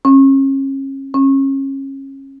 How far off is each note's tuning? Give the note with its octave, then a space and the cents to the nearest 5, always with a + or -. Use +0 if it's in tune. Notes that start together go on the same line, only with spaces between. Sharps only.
C#4 -35
C#4 -30